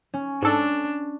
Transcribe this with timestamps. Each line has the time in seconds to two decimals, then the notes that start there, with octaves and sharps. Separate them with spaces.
0.14 C#4
0.42 G#2 D4 A4